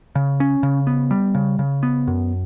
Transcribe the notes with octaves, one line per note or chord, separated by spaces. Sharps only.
C#3
C#4
C#3
B3
G3
C#3
C#3
B3
F#2